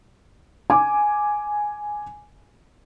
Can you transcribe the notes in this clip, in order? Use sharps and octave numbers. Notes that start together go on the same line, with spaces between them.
G#5 D6